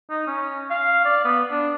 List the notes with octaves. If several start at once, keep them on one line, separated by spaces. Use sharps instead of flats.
D#4
C#4
F5
D5
B3
D4